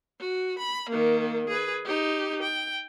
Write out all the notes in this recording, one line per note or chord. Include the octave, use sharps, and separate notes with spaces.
F#4
B5
D#3 A#3
G#4 B4
D#4 G4
G5